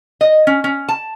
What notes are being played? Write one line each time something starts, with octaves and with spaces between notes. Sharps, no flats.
D#5
C#4
C#4
A5